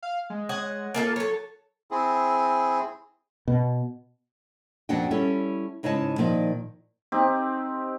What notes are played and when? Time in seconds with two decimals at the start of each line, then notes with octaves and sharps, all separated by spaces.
0.03 F5
0.30 G#3
0.49 C#5 D#5 F#5
0.94 A#3 F4 A4
1.16 F#3 A4 C#5
1.91 C4 E4 G#4
3.48 B2
4.89 F2 A#2 D4 F#4 F#5 G5
5.11 G3 C#4 E4 A4
5.83 G#2 C#3 D#4 E4 C#5 A5
6.18 A#2 D#3 F3 D#4 D5
7.12 C4 D#4 G4